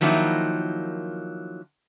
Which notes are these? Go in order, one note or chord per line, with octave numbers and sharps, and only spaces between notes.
D#3 F3 F#3 A#3 D#4 E4